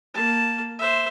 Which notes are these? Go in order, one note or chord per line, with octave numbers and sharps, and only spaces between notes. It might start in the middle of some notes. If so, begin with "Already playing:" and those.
A#3 A5
C5 E5